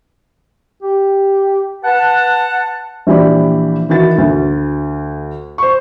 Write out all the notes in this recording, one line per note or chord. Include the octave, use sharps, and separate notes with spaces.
G4
B4 F#5 A5
A#1 E3 G4 D5 B5
D#3 E3 F#4 A6
D2
C5 C#6